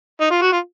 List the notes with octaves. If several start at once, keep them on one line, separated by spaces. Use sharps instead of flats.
D#4
F4
F#4
F4